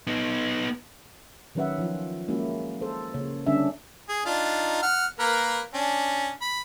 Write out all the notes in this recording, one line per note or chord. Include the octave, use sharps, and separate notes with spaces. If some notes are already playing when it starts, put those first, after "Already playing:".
B3 D#4
D#3 F#3 C#4 B4 E5 F#5
F3 E4 F4
G#3 A#3 C#4 E4 F#4
A4 C5
C#3 A#3 C#5
D3 G3 C#4 D4 E5
G#4
D4 D#4 F4
F#5 F6
A#3 A#4 B4
C#4 D4
B5